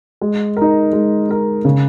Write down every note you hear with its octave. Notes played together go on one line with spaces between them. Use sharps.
G#3
D#4 A#4
G#3
D#4 A#4
C#3